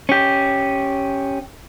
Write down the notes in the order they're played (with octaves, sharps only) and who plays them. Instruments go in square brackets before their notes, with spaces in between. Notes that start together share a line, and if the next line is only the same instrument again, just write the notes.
[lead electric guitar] C#4 G4